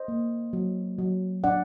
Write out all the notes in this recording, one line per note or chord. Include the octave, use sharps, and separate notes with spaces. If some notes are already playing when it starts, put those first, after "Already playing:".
Already playing: C5 D#5
A#3
F#3
F#3
D4 D5 F#5